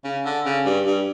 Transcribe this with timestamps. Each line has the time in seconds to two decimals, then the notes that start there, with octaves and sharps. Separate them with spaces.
0.04 C#3
0.25 D3
0.45 C#3
0.65 G2
0.86 G2